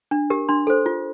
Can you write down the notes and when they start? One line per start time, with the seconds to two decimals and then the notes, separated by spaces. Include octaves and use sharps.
0.11 D4
0.30 G4 A#4
0.49 D4 C6
0.67 A4 C5
0.86 F4